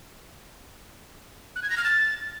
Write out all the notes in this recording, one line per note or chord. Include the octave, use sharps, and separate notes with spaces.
F#6
G#6
A#6
F6
A6